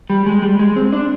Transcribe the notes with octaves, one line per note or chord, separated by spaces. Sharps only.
G3
G#3
G3
G#3
C4
D4